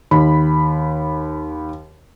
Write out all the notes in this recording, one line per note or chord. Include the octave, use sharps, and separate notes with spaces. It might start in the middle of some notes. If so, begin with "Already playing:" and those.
D#2 B5